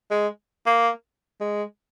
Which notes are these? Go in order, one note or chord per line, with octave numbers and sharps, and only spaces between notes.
G#3
A#3
G#3